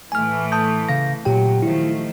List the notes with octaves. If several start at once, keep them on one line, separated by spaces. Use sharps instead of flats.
A2 E3 A3 G#5 F6
A5 D#6 G6
C#3 F5 A#6
A#2 F#3 G4 G5
D#3 F3 A3 E4